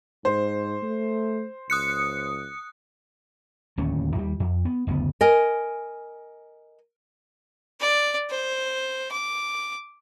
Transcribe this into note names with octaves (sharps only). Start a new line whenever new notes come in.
G#2 C5
A3
C#2 D#6 F#6 C#7
D1 D#2 A3 C#4
D#2 G3
F2
B3
F#1 D2 D3 B3
A#4 D#5 G#5
D5
C5
D6